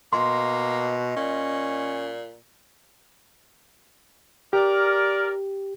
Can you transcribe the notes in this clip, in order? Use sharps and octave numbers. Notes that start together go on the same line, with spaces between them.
B2 A#3 D#5 C6
A#2 C#4
G4 A#4 D5